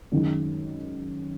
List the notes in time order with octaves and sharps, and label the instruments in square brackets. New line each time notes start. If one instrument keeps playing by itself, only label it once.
[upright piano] F#2 D#3 G#3 D#4